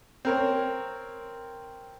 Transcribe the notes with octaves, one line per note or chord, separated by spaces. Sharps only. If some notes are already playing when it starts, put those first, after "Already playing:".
C4 A#4 C#5